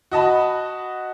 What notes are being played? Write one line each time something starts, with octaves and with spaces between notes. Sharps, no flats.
F#4 D#5 A5 B5